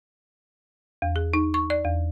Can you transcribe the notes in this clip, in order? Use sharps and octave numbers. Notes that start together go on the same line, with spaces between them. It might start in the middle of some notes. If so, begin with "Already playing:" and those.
E2
G#4
D#4
C#6
D5
E2